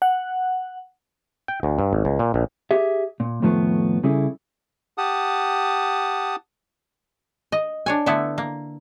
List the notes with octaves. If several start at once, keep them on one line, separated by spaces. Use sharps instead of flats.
F#5
G5
D2
G2
G#1
C#2
A#2
A#1
G4 G#4 E5
A#2
F2 A2 D#3 F3 A3 B3
C#3 G3 C#4 E4 G#4 A4
G4 F#5 A5 D#6
D#5
D4 C#5 G#5
D3 A3 B3 E4
A#3